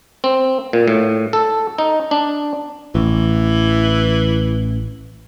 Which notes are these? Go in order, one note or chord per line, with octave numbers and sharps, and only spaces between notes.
C4
A#2
A2
A4
D#4
D4
A1 E3